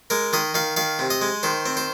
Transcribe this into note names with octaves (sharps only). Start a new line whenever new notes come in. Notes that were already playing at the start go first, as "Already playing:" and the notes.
G#3 A#4
D#3 D#5
D#3 F5
D#3 F5
C3
D#5
G#3
D#3 C5
C4
C5